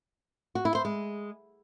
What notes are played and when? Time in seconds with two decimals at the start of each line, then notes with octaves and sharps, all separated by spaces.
0.55 F#4
0.65 E4
0.75 C5
0.85 G#3